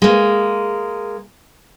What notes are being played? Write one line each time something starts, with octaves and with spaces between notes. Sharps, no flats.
G#3 A#3